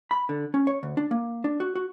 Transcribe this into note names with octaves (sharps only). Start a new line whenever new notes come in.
B5
D3
C#4
C#5
D2
D4
A#3
D4
F#4
F#4